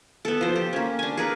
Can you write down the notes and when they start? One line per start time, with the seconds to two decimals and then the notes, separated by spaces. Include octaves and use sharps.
0.25 B3 A4
0.41 F3 C5
0.56 G4
0.73 A#3 C#4
0.99 D4 G#5
1.17 G#4 A#4 B4